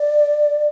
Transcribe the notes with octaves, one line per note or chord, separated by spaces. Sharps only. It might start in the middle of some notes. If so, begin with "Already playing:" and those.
Already playing: D5